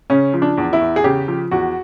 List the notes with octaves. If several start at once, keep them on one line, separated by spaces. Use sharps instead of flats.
C#3 C#4
F3
D4
E2
E4
E2
G#4
C#3 G4
F3
E2 F#4